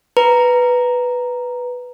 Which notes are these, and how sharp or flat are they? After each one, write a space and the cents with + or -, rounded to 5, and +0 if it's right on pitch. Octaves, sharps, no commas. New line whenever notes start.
B4 +0 A#5 +0